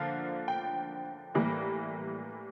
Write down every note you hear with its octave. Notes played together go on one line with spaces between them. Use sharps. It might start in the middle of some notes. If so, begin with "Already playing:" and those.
Already playing: D3 F3 A#3 F5
G5
A2 E3 G3 A#3